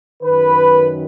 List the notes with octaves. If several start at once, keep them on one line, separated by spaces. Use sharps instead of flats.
F#2 D#3 B4